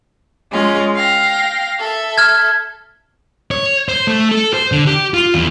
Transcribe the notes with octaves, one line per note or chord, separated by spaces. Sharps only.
G#3 C#4 F4
F5 G5 A#6
A4 E5
F6 G#6
C#5
C5
A3
A4
C5
D3
G4
F4
E2